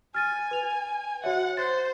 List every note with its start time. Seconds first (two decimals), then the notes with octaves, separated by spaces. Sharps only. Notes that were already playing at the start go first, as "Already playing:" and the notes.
0.14 G#5 F6 A6 D#7
0.51 B4 F7
1.24 F#4 C#5 E5 F#5
1.57 C5 F#6 A6